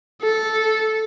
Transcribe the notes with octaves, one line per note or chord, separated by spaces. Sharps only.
A4